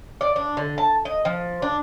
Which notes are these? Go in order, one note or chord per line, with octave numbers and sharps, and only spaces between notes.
D5
D4
D3
A5
D#5
F3
D4